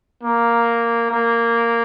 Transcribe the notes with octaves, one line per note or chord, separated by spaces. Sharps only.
A#3
A#3